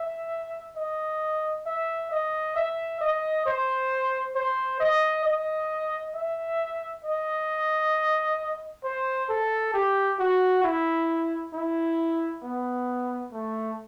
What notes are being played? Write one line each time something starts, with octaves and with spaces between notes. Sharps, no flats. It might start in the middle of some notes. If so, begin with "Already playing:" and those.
Already playing: E5
D#5
E5
D#5
E5
D#5
C5
C5
D#5
D#5
E5
D#5
C5
A4
G4
F#4
E4
E4
B3
A3